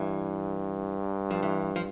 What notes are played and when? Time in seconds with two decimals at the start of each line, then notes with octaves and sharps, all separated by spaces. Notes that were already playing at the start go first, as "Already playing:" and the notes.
Already playing: G2 E3
1.31 F3
1.43 E3
1.76 F3